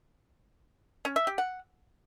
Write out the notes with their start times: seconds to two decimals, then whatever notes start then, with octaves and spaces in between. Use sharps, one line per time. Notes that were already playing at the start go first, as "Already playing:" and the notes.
1.05 C#4
1.16 E5
1.27 G4
1.38 F#5